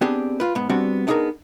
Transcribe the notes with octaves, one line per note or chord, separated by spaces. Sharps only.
B3 C4 D4 G4 G#4
F4 B4
G#2 B3
G3 B3 C4 D4 F#4
B3 D4 D#4 F#4 G#4 A#4